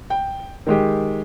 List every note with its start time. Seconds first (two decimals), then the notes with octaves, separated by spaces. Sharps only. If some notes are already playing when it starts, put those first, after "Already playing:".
0.10 G5
0.67 D#3 G#3 G4